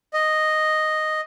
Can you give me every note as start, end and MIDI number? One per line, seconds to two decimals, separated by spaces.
0.13 1.21 75